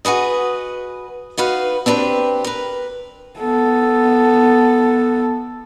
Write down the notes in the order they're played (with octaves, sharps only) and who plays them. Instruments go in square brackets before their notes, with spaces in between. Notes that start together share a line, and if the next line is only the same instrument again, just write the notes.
[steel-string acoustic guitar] F#4 G#4 B4 D#5
D#4 F#4 B4 F5
C4 D4 G4 B4
A#4 B4
[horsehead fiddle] B3 A4